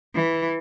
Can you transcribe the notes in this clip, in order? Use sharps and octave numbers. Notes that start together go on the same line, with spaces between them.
E3